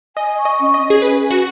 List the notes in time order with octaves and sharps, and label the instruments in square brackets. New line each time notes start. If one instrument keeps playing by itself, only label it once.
[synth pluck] D#5 [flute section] G#5
[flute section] C#6
[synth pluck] D#5
[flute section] C#4
[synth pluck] D#5
[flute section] C#4
[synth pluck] G#4
[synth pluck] B4 [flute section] G#5
[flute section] G#5
[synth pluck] F#4